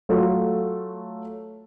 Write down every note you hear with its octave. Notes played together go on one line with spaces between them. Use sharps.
F#3 A3 F4 A4